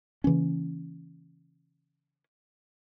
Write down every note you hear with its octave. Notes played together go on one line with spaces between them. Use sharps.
C#3 E3 A#3 C#4